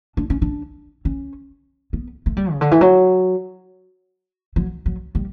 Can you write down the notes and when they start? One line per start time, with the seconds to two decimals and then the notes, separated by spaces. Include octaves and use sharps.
0.17 D4
0.30 C#4
0.42 D4
1.05 C#4
1.93 B3
2.26 A3
2.37 G3
2.52 C#3
2.61 D3
2.71 E3
2.81 F#3
4.56 F#3
4.86 F#3
5.15 G3